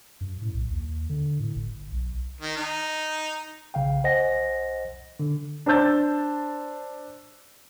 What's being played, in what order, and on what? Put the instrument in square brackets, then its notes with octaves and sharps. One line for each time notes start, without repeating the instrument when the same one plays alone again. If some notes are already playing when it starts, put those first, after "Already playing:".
[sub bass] F#2
A2
B1
D#2
D3
A2
G1
B1
[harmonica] D#3
D#4
[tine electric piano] A#1 C#3 F5 G5
B1 C5 D#5 F#5 G#5 A#6
D3
[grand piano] D4 C5 A5 E6 G6 A6